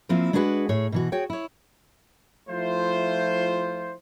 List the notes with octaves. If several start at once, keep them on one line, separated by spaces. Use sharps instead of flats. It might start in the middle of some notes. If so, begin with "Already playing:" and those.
F3 A#3 C4 E4 F4
G#3 D4 F#4 G#4 B4 F#5
A2 G#4 C#5
B2 E3 F#4
F#4 G#4 C#5 G5
E4 C#5
F3 A3 E4 F4 C5